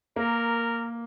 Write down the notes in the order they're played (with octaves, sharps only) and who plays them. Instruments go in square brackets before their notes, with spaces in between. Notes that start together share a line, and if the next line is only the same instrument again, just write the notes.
[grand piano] A#3 [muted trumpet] A#4